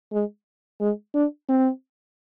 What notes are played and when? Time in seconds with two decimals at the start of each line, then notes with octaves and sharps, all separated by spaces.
0.12 G#3
0.80 G#3
1.15 D4
1.49 C4